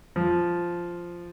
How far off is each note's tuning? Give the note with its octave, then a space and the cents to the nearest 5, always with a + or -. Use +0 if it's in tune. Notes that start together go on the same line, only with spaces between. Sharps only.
F3 -5